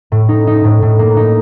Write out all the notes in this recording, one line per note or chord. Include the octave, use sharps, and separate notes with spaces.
A2
D#4
D#4
A2
A2
A#3
D#4